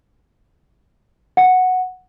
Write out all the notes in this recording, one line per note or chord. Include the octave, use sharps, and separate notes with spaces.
F#5